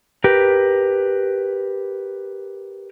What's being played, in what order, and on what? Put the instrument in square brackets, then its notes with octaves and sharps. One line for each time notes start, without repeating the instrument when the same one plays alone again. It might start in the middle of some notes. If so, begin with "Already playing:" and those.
[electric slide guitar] G4 A#4 B4